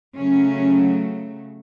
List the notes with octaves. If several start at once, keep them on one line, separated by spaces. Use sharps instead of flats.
C#3 F#3 A3 C#4